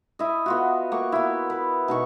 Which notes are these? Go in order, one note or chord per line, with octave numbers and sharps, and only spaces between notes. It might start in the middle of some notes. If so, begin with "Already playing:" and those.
E4 D#5
B3 F4 F#4
A#3 C#6
B3 E4
B4
B2 D#4 C#6